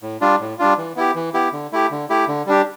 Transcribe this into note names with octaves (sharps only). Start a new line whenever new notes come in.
A2
G3 D4 F4
A2
G3 D4 F4
E3
B3 E4 G4
E3
B3 E4 G4
D3
A3 E4 G4
D3
A3 E4 G4
D3
G3 D4 G4